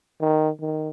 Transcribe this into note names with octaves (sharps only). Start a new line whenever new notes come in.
D#3
D#3